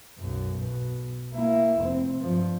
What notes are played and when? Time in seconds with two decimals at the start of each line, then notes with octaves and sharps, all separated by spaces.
0.20 B1 F#2
0.59 B2
1.33 A#3 E4
1.80 F1 C4
2.20 G2 F3